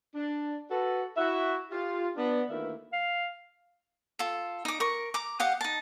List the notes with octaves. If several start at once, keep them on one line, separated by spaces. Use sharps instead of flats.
D4
F#4 A4 B4
E4 F#4 E5
F4 G4
B3 D4
D2 D#3 A#3 E4 B4 E5
F5
F4 A4
D#4 D6
A#4 C#6
A#5 D6
G4 F5 F#5 D#6
D#4 A5